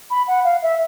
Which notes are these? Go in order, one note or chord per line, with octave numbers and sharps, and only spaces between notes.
B5
F#5
F5
E5